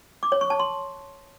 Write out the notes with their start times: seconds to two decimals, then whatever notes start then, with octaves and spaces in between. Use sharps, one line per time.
0.23 D6
0.32 C#5
0.41 C#6
0.50 A5
0.60 C6